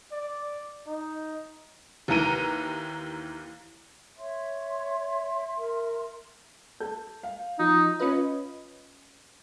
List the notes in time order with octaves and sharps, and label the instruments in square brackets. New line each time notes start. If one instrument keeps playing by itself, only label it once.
[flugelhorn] D5
D#4
[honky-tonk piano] D#2 E3 A#5 D#7
[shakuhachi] C#5 [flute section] E5 C6
[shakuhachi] A#4
[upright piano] A4 G6
F5
[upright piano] F3 [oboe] D#4
[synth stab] C#4 F4 B4 D#5